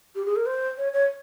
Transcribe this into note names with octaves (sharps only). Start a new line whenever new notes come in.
G4
G#4
A#4
C5
C#5
C#5